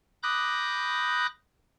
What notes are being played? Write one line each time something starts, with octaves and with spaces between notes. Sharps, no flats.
B5 D6 D#6 F#6 G6 A#6